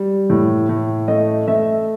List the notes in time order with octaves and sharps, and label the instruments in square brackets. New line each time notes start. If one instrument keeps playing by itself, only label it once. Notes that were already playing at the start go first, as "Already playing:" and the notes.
Already playing: [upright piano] G3
A2
A2
A3 D#5
A3 E5